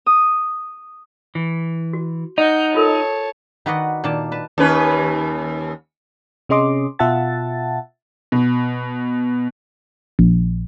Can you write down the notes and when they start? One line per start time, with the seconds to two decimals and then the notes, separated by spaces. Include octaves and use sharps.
0.06 D#6
1.35 E3
1.93 F#4
2.38 D#4 D#5 F#5 G6
2.75 F4 A4 A#4 C#5 A5
3.66 D#3 F#4 B4 D5 D#5 F#5
4.04 A#2 D#3 D5 A5
4.32 B4 A5
4.58 D#2 C#4 B4
6.49 C3 C#4 G#4 D#5 C6 D6
6.99 B2 F4 E5 F#5 A5 A6
8.32 B2
10.19 A#1